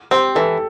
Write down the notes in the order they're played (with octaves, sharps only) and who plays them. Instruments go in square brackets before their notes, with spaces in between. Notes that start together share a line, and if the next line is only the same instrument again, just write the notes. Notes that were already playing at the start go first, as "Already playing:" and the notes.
[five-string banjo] C4 [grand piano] G4
[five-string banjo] E3 [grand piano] A4